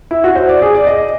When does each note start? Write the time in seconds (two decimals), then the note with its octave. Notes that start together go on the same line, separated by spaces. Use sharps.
0.11 E4
0.24 F#4
0.35 C5
0.49 D5
0.62 G#4
0.74 D5
0.87 D#5